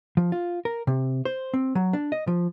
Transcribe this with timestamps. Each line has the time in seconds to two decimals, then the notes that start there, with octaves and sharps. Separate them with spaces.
0.17 F3
0.32 F4
0.65 A#4
0.87 C3
1.25 C5
1.54 C4
1.75 F#3
1.93 D4
2.12 D#5
2.27 F3